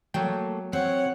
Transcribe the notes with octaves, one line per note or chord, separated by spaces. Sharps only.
F#3 A3 A#3 G5
C4 C#5 F#5